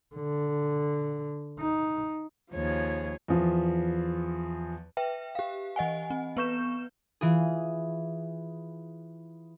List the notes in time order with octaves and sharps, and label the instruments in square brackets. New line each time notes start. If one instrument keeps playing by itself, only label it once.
[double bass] D3
D#4
[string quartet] D#2 F3 G#4 C#5
[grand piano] E2 F3
[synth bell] B4 E5 G5
G4 F5
E3 D#5 F#5 G#5
C4
B3 B4 C#6 G6 E7
[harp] E3 F4 G#4